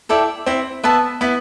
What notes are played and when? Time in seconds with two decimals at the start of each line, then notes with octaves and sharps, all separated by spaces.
0.09 E4 A4 D5 G5
0.46 C4 E4
0.83 B3 B4 E5 A5
1.21 B3 E4